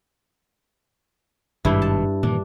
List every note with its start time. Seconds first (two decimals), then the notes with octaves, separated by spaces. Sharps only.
1.65 G#1 G2 B2 D4 E4
1.82 A5
2.23 A#2 D#3 E3 D4